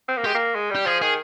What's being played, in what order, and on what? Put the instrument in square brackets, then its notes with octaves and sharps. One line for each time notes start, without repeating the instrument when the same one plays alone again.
[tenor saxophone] C4
A#3
[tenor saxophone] G#3 [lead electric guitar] G4
[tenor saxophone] A#3
G#3
G3
[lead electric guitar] G4
[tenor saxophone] F3 [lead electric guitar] G#4
[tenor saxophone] D#3 [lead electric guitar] G#4